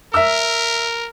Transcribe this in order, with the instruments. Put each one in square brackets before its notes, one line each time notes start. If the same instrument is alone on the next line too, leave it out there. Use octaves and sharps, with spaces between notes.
[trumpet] A#4 [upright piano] E5 E6